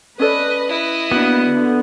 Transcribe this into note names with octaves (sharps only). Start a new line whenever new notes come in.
C#4 A4 B4 D5 D#5
E4 D#5
A#3 B3 D4 F#4
D3